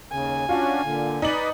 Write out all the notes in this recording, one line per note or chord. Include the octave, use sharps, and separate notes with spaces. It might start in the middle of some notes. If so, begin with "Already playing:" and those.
D#2 C#3 G#5
C#4 D4 F4 F#4
A#2 D3
D#4 B4 D5 B5 F#7